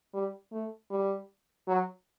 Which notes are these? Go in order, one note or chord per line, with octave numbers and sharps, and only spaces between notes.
G3
A3
G3
F#3